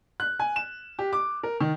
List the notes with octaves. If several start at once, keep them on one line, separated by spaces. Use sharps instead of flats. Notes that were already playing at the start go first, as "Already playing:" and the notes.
F#6
G#5
E7
G4
D6
A#4
D#3